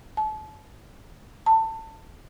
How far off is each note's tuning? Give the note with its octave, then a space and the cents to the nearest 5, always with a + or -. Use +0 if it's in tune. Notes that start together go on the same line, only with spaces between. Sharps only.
A5 -35
A5 +25